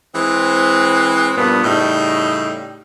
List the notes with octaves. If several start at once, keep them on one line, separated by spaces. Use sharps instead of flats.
E3 G#3 C4
G2 A#2 F3 B3
A2 C#3 G3 D#4